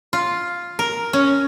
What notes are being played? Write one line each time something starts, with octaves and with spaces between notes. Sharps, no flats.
F4
A#4
C#4